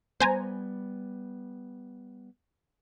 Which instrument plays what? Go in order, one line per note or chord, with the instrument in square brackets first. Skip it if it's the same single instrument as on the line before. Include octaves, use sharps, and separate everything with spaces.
[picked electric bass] G3 A3 B3 [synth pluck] C5 G#5 A#5